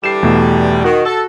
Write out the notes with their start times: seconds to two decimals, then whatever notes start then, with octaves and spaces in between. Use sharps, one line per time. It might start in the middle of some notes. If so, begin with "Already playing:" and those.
0.04 D3 E3 G3 C7 E7
0.23 E2 B2 A3
0.84 D#3 F#4
1.05 A4